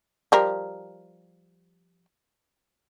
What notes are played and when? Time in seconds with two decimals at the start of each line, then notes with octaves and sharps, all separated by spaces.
0.32 F3 G3 A#4